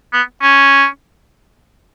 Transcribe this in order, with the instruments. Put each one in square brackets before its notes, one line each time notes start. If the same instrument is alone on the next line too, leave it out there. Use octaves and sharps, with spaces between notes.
[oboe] B3
C#4